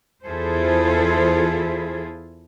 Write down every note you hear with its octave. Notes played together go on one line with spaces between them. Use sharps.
E2 E4 F4 G#4 A4 C5